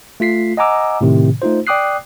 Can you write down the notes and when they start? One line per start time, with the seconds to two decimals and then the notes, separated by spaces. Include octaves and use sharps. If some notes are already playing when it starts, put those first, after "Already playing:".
0.20 A3 F4 B6 C7
0.57 D#5 F#5 G#5 A#5 D6 E6
1.01 A2 C3 D#3
1.42 A3 D#4 F4 C5
1.67 D5 G5 D6 D#6 F#6 C7